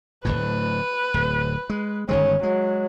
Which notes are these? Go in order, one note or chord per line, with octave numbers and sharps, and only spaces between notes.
D1 G#1 A2 B4
D1
G#3
G1 D#3 G#3 C#4
F#3 G#3